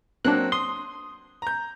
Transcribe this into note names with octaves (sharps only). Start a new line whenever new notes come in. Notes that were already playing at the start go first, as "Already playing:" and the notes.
F#3 A#3 C4 D4 F#6
C6 D#6
A#5 G6